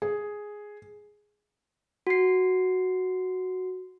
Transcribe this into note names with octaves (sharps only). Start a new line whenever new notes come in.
G#4
F#4 C7